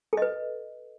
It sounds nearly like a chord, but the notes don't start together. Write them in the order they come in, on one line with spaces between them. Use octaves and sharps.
A4 D#5 B4